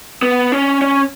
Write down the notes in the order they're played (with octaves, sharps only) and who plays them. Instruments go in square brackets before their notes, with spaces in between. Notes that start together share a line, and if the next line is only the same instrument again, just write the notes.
[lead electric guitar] B3
C#4
C#4